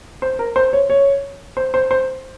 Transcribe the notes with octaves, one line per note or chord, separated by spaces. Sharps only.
C5
A#4
C5
C#5
C#5
C5
C5
C5